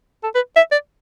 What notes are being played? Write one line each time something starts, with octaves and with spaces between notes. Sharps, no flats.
A4
B4
E5
D5